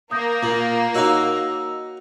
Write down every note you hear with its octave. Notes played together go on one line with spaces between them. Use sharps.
A#3 D#6 G6 A#6
A#2
D#4 F#4 C#5 D#5 E6